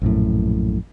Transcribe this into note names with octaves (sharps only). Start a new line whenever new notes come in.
A#1 F#2 A2